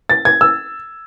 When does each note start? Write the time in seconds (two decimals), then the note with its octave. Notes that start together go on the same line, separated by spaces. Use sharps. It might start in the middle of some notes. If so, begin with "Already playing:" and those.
0.10 A6
0.25 G#6
0.41 E6